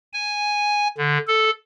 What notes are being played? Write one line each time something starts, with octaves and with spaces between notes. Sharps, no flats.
G#5
D3
A4